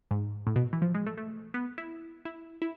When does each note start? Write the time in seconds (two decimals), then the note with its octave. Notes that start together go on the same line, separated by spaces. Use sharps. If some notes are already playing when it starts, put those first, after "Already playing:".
0.11 G#2
0.47 A2
0.56 B2
0.73 E3
0.82 F3
0.94 G#3
1.06 A3
1.18 A3
1.54 B3
1.78 E4
2.25 E4
2.62 E4